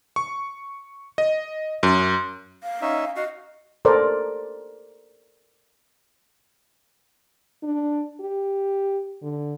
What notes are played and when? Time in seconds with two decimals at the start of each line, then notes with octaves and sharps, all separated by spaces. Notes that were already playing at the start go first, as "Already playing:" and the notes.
0.16 C#6
1.18 D#5
1.83 F#2
2.63 F5
2.82 C#4 D#4 E5
3.16 F#4 D#5 F5
3.85 A4 A#4 C5 D5
7.63 D4
8.20 G4
9.22 D3